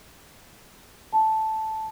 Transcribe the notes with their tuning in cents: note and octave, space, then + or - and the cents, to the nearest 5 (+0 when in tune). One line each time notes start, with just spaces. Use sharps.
A5 -5